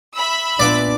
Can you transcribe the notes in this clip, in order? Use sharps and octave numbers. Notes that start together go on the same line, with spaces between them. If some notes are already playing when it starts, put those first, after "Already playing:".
E5 B5 E6
A#2 B3 D4 F4 D5 D6